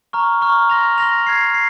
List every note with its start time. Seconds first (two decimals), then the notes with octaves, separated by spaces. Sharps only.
0.13 A#5 C#6 F6
0.41 A#5 C#6 F6
0.70 C6 F6 A#6 F7
0.98 C6 F6 A#6 F7
1.27 F6 G#6 C7
1.54 C7